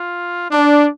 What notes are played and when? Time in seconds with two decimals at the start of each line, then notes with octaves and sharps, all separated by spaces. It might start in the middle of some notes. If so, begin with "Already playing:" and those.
Already playing: F4
0.51 D4